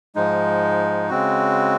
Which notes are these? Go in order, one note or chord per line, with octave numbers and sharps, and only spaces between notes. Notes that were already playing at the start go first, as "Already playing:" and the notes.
G#2 F3 G#3 D#4
C#3 G#3 C4 F#4